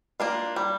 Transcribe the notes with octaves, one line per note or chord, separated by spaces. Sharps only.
A#3 D4 F4
G3